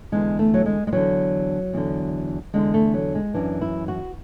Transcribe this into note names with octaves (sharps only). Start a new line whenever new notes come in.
E2 D3 G#3
A3
F#3
G#3
G#3
E2 D3 F#3
E2 D3
E2 D3 G#3
A3
F#3
G#3
F#2 E3 D4
E4
F#4